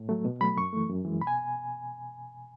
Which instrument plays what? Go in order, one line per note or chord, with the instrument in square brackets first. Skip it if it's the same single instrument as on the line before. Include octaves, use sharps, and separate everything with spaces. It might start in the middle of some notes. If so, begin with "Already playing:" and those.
Already playing: [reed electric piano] A2
F#3 A3
B2
F#3 A3 B5
F#2 C#6
E3 A3
F#2
E3 G#3
B2 B5
G#5